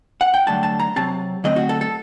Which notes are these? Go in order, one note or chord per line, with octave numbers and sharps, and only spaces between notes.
F#5
G5
G2 D3 F#3 A3 A5
A5
A#5
C3 F#3 C4 A5
D3 F#3 A3 C4 D#5
F#4
A4
A4